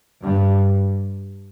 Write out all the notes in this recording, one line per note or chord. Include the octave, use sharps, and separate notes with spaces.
G2